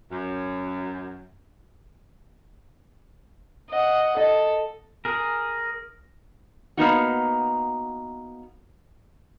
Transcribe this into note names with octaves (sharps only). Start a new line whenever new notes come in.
F#2
D#5 F#5
A4 D#5
G#4 A#4
A#3 B3 D#4 F#4